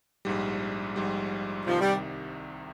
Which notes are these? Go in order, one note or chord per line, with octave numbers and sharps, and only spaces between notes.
A#1 G#2 G3
A#1 G#2 G3
C2 C3 D#3 F3
G3